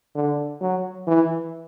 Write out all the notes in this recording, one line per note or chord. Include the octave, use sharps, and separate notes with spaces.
D3
F#3
E3